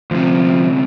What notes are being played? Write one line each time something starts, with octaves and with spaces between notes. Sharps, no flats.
D2 C3 F3